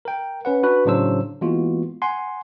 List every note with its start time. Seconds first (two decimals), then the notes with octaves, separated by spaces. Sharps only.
0.05 A#4 G5
0.45 C#4 B4 F#5
0.63 D4 F#4 B4 F#6
0.85 A2 C#3 F#3 D4 C5 E6
1.41 E3 G#3 A#3 B3 F4 F#4
2.02 F#5 G#5 C6